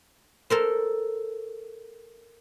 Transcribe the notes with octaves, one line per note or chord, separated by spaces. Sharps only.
A4 A#4 C5